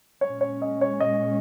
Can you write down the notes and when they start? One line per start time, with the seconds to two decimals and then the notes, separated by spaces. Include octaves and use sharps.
0.21 A#2 G#3 C#4 C#5
0.41 C#5
0.62 D#5
0.81 C#5
1.00 D#5